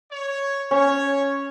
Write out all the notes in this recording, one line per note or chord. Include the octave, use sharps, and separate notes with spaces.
C#5
C#4 C#5